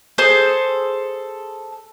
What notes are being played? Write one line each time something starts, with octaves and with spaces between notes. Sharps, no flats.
G#4 A4 C5